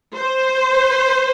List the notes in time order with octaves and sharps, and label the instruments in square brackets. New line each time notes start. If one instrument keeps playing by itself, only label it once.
[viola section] C5